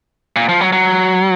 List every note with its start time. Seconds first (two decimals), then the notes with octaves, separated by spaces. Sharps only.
0.36 A#2
0.49 F3
0.61 F#3
0.73 F#3